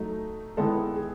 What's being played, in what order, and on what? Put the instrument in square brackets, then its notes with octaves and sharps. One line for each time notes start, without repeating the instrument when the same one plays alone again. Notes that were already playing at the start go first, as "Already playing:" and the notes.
Already playing: [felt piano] F#3 A3 D#4
D#3 G#3 B3 E4 A4
G#4